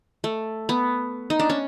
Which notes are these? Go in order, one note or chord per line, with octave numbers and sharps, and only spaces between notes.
A3
B3
D#4
D4
C#4